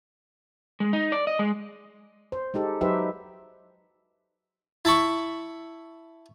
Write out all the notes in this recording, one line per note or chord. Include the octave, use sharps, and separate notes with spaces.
G#3
D#4
D5
D#5
G#3
C5
G#3 D#4 G4 A4
F#3 D#4 G4 B4 C5 E5
E4 A5 B5 C#6